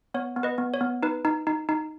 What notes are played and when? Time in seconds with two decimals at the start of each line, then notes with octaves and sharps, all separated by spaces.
0.14 B3 C#5
0.36 B3
0.43 B4 D#5
0.58 B3
0.74 C#5
0.81 B3
1.03 D#4 B4
1.25 D#4
1.47 D#4
1.69 D#4